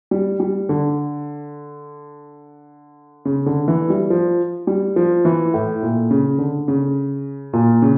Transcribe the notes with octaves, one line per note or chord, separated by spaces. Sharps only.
G3
G3
D3
C#3
D3
E3
G3
F3
G3
F3
E3
A2
A#2
C#3
D3
C#3
A#2
C#3